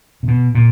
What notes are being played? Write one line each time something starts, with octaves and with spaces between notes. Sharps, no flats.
C3
B2
A#2